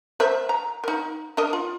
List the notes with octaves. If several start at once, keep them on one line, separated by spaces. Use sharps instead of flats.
A#4 C5 E5
A#5
D#4 A#4
D4 A#4 D#5
F4